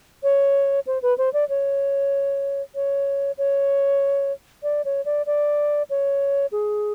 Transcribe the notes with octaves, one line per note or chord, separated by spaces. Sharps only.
C#5
C5
B4
C5
D5
C#5
C#5
C#5
D5
C#5
D5
D5
C#5
G#4